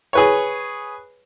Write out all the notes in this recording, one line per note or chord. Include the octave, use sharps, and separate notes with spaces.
G#4 B4 C#5